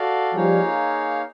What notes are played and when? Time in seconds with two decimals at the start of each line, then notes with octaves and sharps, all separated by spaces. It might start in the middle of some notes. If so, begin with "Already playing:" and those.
Already playing: F#4 A4 D5 F5
0.35 F3 G3 A#3 D#4 G#4 C#5 F5